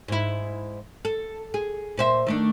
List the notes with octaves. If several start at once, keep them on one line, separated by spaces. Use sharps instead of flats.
G#2 E4
A4
G#4
A#2 C5 E5
D#3 A3 D4